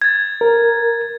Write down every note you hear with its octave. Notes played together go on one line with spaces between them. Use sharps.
G#6 A6
A#4